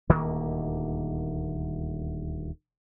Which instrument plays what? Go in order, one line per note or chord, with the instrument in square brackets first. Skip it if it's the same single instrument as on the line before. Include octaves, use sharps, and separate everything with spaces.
[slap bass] D#1 D2 D#3 A#3